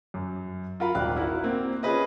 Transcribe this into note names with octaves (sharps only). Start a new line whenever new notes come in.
F#2
F4 F#4 A#4 F5 B5
D#1 G#1 D4 F5 G5 F#6
E4 F#4 A#4
A#3 C4
C#4 F4 G#4 B4 D#5